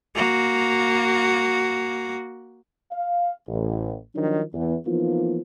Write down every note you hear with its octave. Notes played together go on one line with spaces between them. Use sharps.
A#3 F#4
F5
A1
D#3 F3 F#3 D4 D#4
E2
E3 F3 A#3 B3 D#4 F4